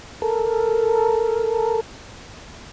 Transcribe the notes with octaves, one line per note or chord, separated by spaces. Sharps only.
A4 A#4